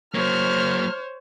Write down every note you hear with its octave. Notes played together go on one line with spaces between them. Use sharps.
F#3 A#3 C5 C#5 F6